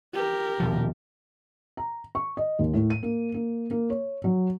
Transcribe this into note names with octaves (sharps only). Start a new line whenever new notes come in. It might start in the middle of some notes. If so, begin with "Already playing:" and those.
G4 A#4
D#1 B2 F3
A#5
C#6
D#5
D#2
A2
D#7
A#3
A#3
A#3
C#5
F#3